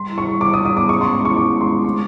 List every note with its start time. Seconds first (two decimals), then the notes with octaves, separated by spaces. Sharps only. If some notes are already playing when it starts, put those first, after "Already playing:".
Already playing: G3 C6
0.09 E4
0.18 C#6
0.26 G3
0.41 G3 D6
0.53 D#6
0.58 G3
0.65 D#6
0.73 B3 D6
0.89 C#4 C#6
1.01 C6
1.05 G#3
1.13 C6
1.20 E4
1.25 C#6
1.36 G#3 D6
1.52 G#3
1.61 C6
1.69 G#3
1.84 A3 C#6